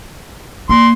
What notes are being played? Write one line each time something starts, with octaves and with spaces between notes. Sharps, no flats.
A#3 C6